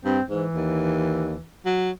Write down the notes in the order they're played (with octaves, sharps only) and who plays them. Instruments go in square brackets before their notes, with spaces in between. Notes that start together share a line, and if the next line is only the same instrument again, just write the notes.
[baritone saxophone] G2 [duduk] C4
[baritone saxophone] G#2 [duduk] E3
[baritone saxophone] D#2
F#3